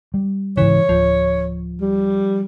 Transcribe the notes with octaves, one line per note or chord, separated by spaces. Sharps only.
G3
G#2 C#3 E3 C#5
D1 F3
G3